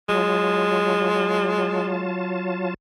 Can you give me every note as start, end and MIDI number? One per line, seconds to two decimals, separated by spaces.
0.09 2.74 54
0.09 2.15 56
0.09 2.74 65
0.09 2.74 81